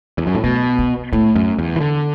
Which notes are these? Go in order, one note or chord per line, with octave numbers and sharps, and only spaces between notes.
E2
F#2
A2
B2 A3
B3
A2 A3
F#2
E2
E3
D3